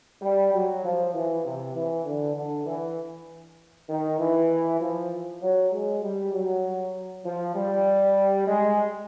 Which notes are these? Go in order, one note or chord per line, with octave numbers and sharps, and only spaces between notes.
G3
F#3
F3
E3
C3
E3
D3
D3
E3
D#3
E3
F3
F#3
G#3
G3
F#3
F3
G3
G#3